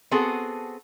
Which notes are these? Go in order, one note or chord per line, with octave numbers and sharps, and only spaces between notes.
B3 C4 F#4 G#4 A4